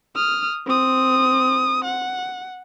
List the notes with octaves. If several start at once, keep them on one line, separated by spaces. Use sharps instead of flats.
D#6 F6
C4 D#6
F#5